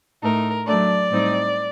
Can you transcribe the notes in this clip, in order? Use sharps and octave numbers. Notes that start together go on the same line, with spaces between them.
A2 A3 D#4 A#4
F#3 A3 D4 D5
A2 G3 C4 D#4